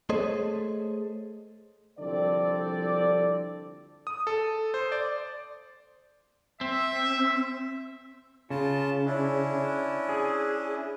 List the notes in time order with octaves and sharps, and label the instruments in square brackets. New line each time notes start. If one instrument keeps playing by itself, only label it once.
[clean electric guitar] A3 G#4 A4 C5 C#5 D#5
[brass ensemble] C2 D3 F3 C4 A4 D5
[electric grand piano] D#6
A4
C5
D5
[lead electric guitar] C4 [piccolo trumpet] E5
[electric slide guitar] C#3 [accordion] F4 A5
[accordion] C#4 D4 E4
[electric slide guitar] G#4